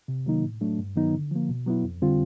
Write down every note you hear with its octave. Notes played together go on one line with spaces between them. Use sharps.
C3
D#3 F#3 A#3 D#4
A2
F#3 A3 D4
G2
D#3 F#3 B3 D#4
D3
F3 A#3
B2
F#3 B3 E4
F2
D3 G3 C4 F4